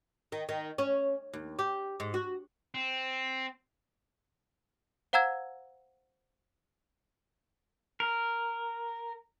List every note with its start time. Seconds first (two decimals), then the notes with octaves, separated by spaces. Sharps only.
0.32 D#3
0.49 D#3
0.78 C#4
1.33 D#2
1.59 G4
2.00 G#2
2.14 F#4
2.75 C4
5.13 C5 F5 F#5 A#5 E6 G#6
8.00 A#4